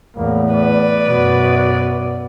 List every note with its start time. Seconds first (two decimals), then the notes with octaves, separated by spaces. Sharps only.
0.17 E2 A2 A#3
0.54 B4 D5
1.07 F#2 B2